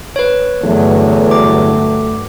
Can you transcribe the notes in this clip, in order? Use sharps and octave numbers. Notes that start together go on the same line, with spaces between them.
B4 C#5
E2 G2 D3 F#3 A3
D6